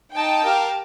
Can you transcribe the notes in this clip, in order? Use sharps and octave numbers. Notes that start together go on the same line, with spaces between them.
D#4 G5 A5
G4 A#4 F5